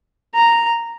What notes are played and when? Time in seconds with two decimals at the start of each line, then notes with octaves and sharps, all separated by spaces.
0.35 A#5